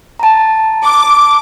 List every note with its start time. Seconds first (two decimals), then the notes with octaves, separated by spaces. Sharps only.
0.20 A5 A#5
0.84 D6